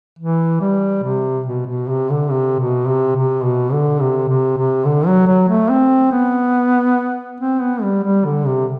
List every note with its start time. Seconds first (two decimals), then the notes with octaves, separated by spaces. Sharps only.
0.19 E3
0.61 G3
1.03 C3
1.47 B2
1.67 B2
1.88 C3
2.10 D3
2.30 C3
2.60 B2
2.88 C3
3.16 C3
3.44 B2
3.73 D3
4.01 C3
4.29 C3
4.57 C3
4.85 D3
5.07 F#3
5.27 F#3
5.49 A3
5.70 C4
6.12 B3
7.40 C4
7.61 B3
7.83 G3
8.03 G3
8.25 D3
8.46 C3